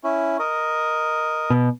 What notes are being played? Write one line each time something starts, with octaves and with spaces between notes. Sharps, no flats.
C#4 E4
A#4 D#5
B2